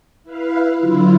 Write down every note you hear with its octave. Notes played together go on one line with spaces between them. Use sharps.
E4 B4 F5
D3 F#3 E4 F4